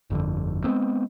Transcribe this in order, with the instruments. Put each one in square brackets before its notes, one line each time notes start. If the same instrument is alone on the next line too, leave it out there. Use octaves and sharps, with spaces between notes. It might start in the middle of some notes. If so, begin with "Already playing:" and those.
[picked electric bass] G1 F2 D3
G#3 A3 B3 C4